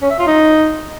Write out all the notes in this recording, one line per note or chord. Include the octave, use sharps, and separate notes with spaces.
C#4
E5
F4
D#4